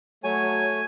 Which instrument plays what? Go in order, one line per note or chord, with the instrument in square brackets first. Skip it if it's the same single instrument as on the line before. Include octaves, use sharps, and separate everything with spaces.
[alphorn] F#3 [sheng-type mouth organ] A3 C#5 [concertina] G#5